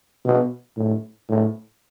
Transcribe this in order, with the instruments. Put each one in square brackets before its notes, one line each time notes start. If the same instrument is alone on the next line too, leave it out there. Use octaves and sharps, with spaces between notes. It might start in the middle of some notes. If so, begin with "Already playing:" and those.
[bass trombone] B2
A2
A2